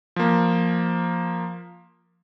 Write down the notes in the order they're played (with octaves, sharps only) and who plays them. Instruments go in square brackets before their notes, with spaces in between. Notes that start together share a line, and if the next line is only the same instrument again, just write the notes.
[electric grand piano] F3 A#3